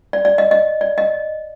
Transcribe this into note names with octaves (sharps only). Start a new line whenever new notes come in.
D5
D5
D#5
D#5
D5
D#5